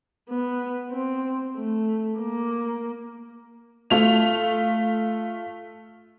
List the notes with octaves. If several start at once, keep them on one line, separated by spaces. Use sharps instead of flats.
B3
C4
A3
A#3
A3 F4 F7